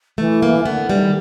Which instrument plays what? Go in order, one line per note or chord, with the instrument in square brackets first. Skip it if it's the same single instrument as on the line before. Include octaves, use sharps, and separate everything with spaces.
[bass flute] E3 [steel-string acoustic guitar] A3
[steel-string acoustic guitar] A#3
[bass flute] D3 [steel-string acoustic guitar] B3
[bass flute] D3 [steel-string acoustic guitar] G3
[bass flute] D#3